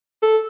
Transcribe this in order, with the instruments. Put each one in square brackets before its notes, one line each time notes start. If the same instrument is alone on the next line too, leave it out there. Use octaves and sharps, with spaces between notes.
[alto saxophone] A4